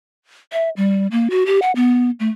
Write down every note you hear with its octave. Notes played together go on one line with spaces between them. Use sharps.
E5
G3
A#3
F#4
G4
F#5
B3
A3